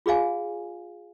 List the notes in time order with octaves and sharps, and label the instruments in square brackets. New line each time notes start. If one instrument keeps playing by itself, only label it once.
[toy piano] F4 G#4 D5 F5 G#5